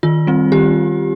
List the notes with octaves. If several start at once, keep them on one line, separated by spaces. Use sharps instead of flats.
D#3 F4
G3 C4
D#3 G4